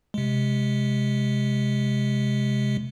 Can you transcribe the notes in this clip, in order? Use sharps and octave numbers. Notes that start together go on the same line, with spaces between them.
C3 G#3